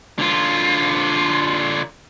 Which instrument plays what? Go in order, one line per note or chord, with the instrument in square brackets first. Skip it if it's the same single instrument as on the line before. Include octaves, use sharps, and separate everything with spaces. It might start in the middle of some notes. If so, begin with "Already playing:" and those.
[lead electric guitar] D3 F4